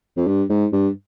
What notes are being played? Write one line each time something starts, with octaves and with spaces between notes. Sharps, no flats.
F2
G2
G#2
G2